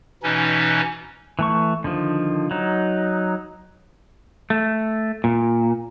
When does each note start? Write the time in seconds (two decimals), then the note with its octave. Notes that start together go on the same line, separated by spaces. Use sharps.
0.23 B2 E3 C#4 D#4
1.39 E3 A3 C#6
1.84 D3 D#3 F3
2.51 F#3 D#4
4.50 A3
5.24 A#2